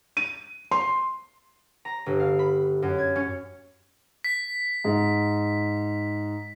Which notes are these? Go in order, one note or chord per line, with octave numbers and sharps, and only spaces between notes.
D#7
C6
A#5
G1
F5
B5
F#2
G#6
C#4
B6
G#2 G#3